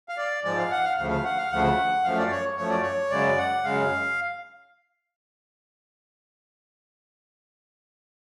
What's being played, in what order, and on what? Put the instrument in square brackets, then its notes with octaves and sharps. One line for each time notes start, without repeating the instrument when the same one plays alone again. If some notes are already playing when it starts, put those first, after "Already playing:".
[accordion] F5
D5
G#2 F3 G#3 D5
F5
F#5
F5
D2 C#3 F3 A3 F5
F5
F#5
F5
D2 C#3 F3 A3 F#5
F#2 F3 A3 F5
D5
C#5
F#2 F3 A3 C#5
D5
C#5
F#2 C#3 G#3 D5
F#5
F#2 C#3 G#3 F5